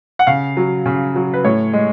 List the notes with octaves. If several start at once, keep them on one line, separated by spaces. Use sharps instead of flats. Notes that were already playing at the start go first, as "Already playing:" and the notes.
F#5
C#3 F5
F#3
C#3
F#3
B4
A2 C#5
G#3